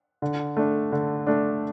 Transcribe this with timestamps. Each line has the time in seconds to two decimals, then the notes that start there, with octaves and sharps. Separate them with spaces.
0.22 D3
0.57 A3 D4
0.92 D3
1.27 A3 D4